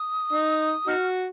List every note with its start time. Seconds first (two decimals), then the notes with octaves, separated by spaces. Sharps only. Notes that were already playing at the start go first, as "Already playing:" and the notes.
Already playing: D#6
0.33 D#4
0.88 D#4 F#4 F6